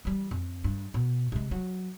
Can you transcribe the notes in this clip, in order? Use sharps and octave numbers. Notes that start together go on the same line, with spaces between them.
E3 G3
F2
G2
B2
C3 G#3
F#3